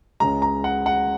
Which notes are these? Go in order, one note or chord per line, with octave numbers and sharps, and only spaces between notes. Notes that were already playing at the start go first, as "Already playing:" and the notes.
C#2 C#3 G#3 A#5
A#5
F#5
F#5